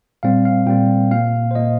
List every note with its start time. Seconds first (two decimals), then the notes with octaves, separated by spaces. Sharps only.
0.23 A#2 G3 C4 F5
0.45 F5
0.67 A#2 G3 C4 G5
1.11 A#2 A#3 F5
1.51 C5
1.55 A#2 A#3 D#5